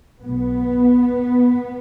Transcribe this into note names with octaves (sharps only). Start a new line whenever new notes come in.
B1 B2 B3